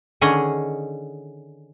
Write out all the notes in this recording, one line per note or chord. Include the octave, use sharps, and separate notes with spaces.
D3 D#3 C#4 G#4 D#5